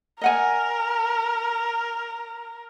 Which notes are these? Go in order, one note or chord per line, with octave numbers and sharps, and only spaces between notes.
A#4 D#5 F#5 G#5